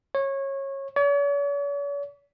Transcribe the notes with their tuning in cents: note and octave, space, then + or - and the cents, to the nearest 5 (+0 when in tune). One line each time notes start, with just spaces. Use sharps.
C#5 -20
C#5 +45